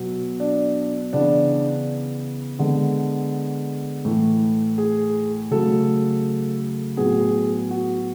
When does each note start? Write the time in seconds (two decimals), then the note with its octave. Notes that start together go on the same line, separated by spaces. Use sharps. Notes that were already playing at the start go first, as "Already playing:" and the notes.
Already playing: B2 F#3 B3
0.40 D4
1.13 C#3 E3 B3 D4
2.59 D3 G#3 B3
4.05 A2 E3 A3
4.78 G#4
5.51 C#3 F#3 A3 A4
6.97 A2 F#3 B3 G#4
7.71 F#4